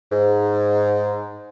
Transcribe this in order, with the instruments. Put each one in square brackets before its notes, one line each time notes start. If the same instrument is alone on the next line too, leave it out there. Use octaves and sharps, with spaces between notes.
[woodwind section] G#2